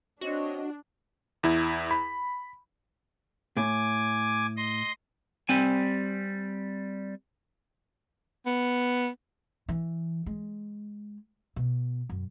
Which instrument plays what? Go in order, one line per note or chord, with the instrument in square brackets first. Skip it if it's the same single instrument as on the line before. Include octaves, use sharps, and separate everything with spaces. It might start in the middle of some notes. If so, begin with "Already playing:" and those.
[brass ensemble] C4 C#5 D#5 [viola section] D4 [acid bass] F#4
[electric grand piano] E2 E4
B5
[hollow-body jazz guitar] A2 [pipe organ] G#5 D6
[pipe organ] D#5 C6
[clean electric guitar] G3 C4 G#5
[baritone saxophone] B3
[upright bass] E3
G#3
B2
F#2